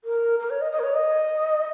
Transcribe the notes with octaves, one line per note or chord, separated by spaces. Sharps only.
A#4
A#4
C#5
D#5
D#5
A#4
C#5
D#5